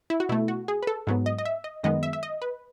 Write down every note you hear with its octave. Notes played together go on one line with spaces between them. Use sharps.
E4
F#4
B2 A3 E4
F#4
G#4
B4
A4
G#2 F#3 B3
D#5
D#5
E5
D#5
F#2 D#3 G#3 B3 D#5
E5
E5
D#5
B4